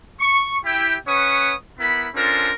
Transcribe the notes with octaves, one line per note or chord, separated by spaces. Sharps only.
C#6
E4 G4 G5
C#4 B4 C#5 F#5 C#6 D#6
B3 E4 A#4 B5
C#4 D4 F4 A4 A#4 C5